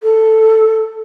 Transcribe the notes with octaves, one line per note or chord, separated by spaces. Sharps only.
A4